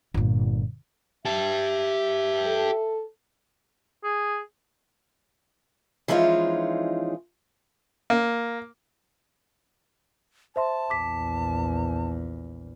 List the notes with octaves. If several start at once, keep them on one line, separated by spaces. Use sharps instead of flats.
G1 A#2
G4 E5 A5
A4
G#4
E3 F3 G#3 C#4 D#4 F4
A#3
C5 E5 A5 C6
A#1 E2 D6 B6